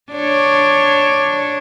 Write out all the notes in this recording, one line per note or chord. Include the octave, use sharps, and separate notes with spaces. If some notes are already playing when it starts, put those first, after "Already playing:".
D4 C#5